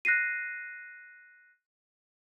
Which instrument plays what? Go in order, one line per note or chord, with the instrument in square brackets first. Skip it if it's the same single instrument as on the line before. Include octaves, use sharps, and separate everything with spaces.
[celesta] F#6 A#6 C7 D#7